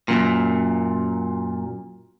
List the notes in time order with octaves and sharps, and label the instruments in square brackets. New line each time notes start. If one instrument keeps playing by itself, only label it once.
[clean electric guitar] F#2 A#2